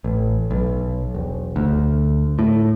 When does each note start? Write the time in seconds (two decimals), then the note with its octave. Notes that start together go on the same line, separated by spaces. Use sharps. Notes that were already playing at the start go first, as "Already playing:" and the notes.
0.04 A1
0.51 B1
1.15 E1
1.56 D2
2.39 A2